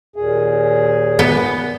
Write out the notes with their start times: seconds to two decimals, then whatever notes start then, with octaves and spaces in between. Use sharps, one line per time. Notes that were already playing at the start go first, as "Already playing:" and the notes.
0.16 D#2 A#2 G#4
1.19 B3